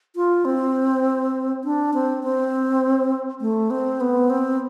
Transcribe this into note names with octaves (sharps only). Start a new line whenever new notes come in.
F4
C4
D4
C4
C4
A3
C4
B3
C4